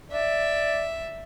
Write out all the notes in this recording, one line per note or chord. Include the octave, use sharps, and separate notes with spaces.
D5 E5